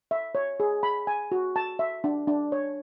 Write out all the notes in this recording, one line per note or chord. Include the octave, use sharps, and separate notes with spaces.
E5
C#5
G#4
B5
G#5
F#4
A5
E5
D4
D4
C#5